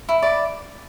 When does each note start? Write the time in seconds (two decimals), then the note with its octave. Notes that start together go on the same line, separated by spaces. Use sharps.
0.09 E4
0.23 D5